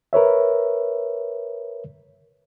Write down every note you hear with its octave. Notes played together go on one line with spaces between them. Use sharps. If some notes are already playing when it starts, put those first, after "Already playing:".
A#4 B4 C#5 E5